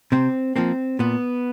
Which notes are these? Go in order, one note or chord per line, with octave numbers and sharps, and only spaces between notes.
C3 C4
F3 A#3 C4
A#2 B3